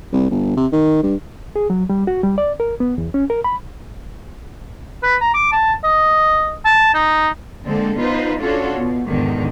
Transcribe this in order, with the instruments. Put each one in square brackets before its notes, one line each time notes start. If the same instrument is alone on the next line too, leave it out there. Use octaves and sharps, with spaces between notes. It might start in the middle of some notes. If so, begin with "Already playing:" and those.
[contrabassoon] C2
G1
C3
D#3
G2
[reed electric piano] G#4
F#3
G3
F#4
G3
D5
A#4
B3
E2
C#4
A#4
B5
[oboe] B4
A#5
D6
A5
D#5
A5
D#4
[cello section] D3 G#3 A#3 C4 A4
B3 D#4 F4 B4 C5
C#4 D4 F4 F#4 A4 C#5
B2
E2 G#2 B2 D3 D#3